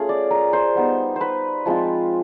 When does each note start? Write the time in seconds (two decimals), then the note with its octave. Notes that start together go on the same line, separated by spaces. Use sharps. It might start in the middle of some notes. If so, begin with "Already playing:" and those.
Already playing: A3 C#4 F4 G#4
0.09 D5
0.31 A#4
0.53 C5
0.75 G3 B3 D#4
1.16 B4 C5
1.66 F3 G#3 C4 F4